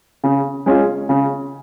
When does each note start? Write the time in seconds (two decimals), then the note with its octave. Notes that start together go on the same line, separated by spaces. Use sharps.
0.24 C#3
0.66 G#3 C#4 F4
1.09 C#3